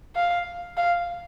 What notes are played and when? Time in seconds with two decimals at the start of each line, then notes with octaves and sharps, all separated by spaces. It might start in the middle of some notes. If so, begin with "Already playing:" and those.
0.15 F5
0.77 F5